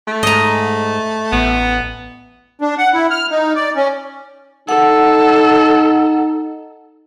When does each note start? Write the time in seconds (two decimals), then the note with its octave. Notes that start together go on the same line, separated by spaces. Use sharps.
0.08 A3
0.23 G#2 D#5 A#5
1.32 A1 B3
2.61 D4
2.78 F#5
2.94 E4
3.11 F6
3.31 D#4
3.56 D5
3.76 C#4
4.69 D#4 A4 F#5